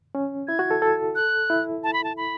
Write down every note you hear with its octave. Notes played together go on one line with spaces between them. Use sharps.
C#4
E4 G#6
F#4
A4
A4
F#6
E4
A5
B5
A5
B5